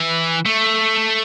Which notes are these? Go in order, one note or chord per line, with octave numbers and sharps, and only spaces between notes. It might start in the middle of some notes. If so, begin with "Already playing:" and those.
Already playing: E3
A3